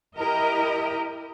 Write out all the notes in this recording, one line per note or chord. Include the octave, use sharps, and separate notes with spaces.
E4 G4 A#4 D#5